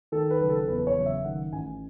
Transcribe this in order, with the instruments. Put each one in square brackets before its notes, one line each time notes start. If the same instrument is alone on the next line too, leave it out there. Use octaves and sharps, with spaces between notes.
[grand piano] D#3 A4
B4
F#1
A4
E2 B4
C#5
F#1
E5
D#3 F#5
A1 G#5